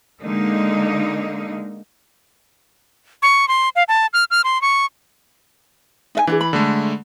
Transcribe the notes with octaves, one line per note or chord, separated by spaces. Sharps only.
D3 G#3 A#3 D#4
C#6
C6
F5
A5
F6
F6
C6
C#6
D#4 E5 G#5
E3 D4 F4 G#4
B5
D3 G#3 A3